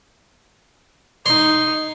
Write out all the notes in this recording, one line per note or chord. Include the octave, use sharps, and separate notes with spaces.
D#4 C#5 C6